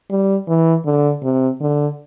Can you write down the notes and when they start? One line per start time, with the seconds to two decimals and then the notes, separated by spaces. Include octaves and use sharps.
0.10 G3
0.48 E3
0.85 D3
1.23 C3
1.61 D3